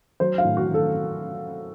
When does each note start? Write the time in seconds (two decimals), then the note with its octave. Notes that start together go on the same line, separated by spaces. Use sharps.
0.20 F#3 C5
0.38 F5
0.45 A2
0.57 F#4
0.68 F#3
0.74 A4